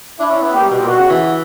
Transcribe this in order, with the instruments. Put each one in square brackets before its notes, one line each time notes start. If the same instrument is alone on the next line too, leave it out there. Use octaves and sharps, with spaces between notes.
[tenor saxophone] D4 [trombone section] E4
[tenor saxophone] C#4
B3
[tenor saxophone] A#3 [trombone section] G4
[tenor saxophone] G3
B2
A#2
[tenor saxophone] B2 [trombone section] F#4
[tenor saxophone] C#3
E3